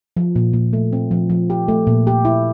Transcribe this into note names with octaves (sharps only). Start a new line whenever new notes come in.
F3
A#2
A#2
A3
C4
F3
F3
G4
A3
A#2
G4
E4